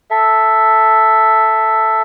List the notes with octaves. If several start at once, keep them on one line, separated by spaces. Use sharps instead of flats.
A4 E5